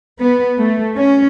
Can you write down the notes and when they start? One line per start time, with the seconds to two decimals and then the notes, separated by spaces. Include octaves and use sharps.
0.20 B3
0.60 A3
0.96 C#4